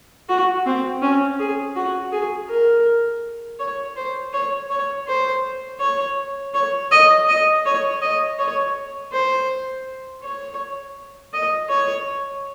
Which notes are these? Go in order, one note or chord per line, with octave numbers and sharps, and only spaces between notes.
F#4
C4
C#4
G#4
F#4
G#4
A#4
C#5
C5
C#5
C#5
C5
C#5
C#5
D#5
D#5
C#5
D#5
C#5
C5
C#5
D#5
C#5